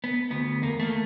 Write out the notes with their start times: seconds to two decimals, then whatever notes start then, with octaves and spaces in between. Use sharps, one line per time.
0.04 B3
0.31 D2 B3
0.62 E2 A#3
0.80 A3 A#3